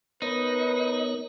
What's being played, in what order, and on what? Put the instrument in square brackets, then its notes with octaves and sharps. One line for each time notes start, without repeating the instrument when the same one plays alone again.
[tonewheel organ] B3 A#4 C#5 [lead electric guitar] D#4 [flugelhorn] B4